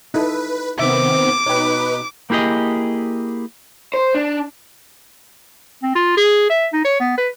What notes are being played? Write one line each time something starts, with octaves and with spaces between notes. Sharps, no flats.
D#4 E4 A4 B4
C3 D#3 B3 C4 E5 D6
B2 D#4 B4 C#5 G5
A#3 E4 G4 G#4 D#5
C5
D4
C4
F4
G#4
E5
D#4
C#5
B3
B4